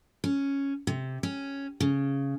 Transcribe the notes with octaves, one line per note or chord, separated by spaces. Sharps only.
C#4
C3
C#4
C#3